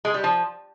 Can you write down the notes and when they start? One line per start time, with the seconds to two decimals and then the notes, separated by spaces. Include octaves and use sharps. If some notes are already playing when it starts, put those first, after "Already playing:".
0.05 G#3
0.14 G3
0.24 F3